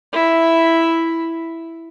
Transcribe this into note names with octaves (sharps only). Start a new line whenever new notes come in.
E4 E5